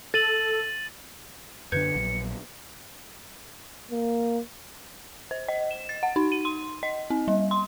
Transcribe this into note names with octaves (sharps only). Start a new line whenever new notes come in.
A4 A6 D#7 F#7
F#2 D3 D4 B4 G6 G#6 C#7
A#1 F#3
A#3
C5
D#5
E7
A6
F#5
D#4
D#7
C6
D#5
C4
G3
C6